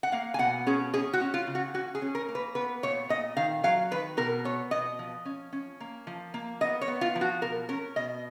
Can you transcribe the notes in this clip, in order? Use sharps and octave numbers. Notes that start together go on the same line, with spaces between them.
F#5
A#3 F5
G#5
B2 F#5
C#4 G#4
C#4 G#4
F#4
C#4
F4
C#3
F#4
C#4 F#4
G#4
C#4
A#4
A#3
B4
B3 B4
A#2 C#5
A#2 D#5
D#3 F5
F#3 F5
D#3 B4
B2 A#4
B3 C#5
B2 D#5
F3
C#4
C#4
A#3
F3
A#3
B3 D#5
C#5
B3
F4
F3
F#4
B2 A#4
C#4 A#4
B2 D#5